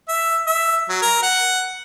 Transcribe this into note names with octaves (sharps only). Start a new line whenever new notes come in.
E5
E5
F#3
A#4
F#5